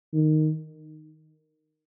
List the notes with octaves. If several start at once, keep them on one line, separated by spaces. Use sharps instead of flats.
D#3